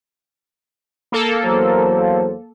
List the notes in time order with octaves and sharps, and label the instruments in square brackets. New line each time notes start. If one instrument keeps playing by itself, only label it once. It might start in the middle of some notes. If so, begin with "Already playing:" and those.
[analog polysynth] A#3 A4
[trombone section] E2 F#3 C5